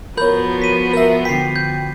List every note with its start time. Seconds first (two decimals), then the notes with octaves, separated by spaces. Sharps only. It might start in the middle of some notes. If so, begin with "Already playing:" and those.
0.17 F3 B3 F#4 A#4 C#5 B5 G6
0.62 B6 D#7
0.93 A#4 E5
1.25 D3 G5 B6 C7
1.56 G6